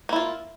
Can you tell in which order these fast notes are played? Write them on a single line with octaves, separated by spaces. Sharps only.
A#3 E4 F4